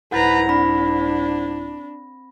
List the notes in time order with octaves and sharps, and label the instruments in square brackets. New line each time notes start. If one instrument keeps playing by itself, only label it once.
[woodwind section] C2 G#2 E4 [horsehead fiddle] B4 A#5 [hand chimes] F#5 G6 A6
[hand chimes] C4 B5 A#6 [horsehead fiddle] D4